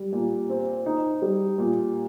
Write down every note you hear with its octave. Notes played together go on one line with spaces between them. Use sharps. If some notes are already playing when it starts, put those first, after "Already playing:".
Already playing: G3
A#2
C4
D#4
G3
A#2